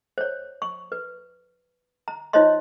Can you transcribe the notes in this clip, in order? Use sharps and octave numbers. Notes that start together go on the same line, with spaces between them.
C5 C#5
C#6
B4
A#5
D#4 F4 C5 C#5 D#5 C6